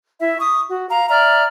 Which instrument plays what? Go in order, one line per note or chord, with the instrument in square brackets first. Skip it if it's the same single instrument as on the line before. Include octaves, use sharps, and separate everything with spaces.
[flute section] E4 E5
C#6 D#6
F#4
F5 A#5
D5 E5 A#5 F6